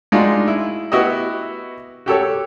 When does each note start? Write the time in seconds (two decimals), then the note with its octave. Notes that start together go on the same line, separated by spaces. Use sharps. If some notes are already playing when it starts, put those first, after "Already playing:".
0.12 G#3 D4 D#4 F4 F#4
0.47 E4
0.92 B3 E4 F#4 G4 D#5
2.06 F#4 G4 A4 C#5